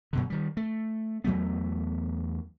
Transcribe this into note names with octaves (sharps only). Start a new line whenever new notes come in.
F#2 B2 D3
D#3 G3
A3
E2 F#3 A3 B3